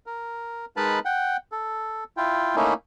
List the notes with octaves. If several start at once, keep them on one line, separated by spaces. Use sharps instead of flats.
A#4
G#3 D#4 A#4 B4 A5 B5
F#5 G5
A4
E4 F4 G5
A3 A#3 C#4 D#4 E4